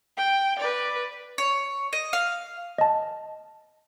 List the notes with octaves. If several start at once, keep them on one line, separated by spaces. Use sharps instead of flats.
G5
B4 D5
C#5
D#5
F5
D#5 A5